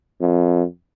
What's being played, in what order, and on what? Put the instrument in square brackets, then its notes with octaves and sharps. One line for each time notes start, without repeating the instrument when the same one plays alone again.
[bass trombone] F2